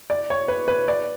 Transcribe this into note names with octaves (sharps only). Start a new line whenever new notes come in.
D5
C#5
B4
B4
D5